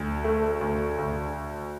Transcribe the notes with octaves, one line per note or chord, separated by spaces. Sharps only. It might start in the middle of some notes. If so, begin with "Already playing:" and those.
Already playing: D2
A3
D2
D2